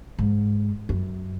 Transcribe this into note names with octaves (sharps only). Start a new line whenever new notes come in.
G#2
F#2